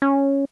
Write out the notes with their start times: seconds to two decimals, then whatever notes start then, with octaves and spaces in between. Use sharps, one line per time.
0.02 C#4